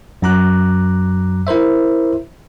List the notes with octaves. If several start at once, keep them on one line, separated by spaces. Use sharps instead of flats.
F#2 F#3 A#5 D6 F#6
E4 A#4 C5 E5